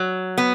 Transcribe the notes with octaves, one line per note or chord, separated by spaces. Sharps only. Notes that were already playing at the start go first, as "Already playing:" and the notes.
Already playing: F#3
B3